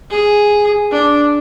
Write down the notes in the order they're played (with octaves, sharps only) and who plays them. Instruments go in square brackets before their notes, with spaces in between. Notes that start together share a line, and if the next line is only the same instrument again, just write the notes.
[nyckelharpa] G#4
D4